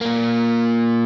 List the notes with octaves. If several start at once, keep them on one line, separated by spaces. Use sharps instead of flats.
A#2 A#3